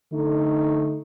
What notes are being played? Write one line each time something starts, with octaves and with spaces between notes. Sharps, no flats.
D3 A3 D#4